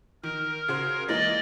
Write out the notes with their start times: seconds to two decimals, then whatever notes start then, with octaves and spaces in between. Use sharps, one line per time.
0.23 D#3 A#4
0.68 C#3 F#4 C5
1.08 E3 G#3 A#3 D5 D#5